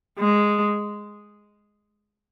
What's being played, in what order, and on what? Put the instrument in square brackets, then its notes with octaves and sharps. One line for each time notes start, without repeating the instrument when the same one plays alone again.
[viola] G#3